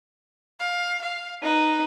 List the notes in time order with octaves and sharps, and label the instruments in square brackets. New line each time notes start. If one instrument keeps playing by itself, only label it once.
[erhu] F5
F5
[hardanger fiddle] D#4 [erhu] B4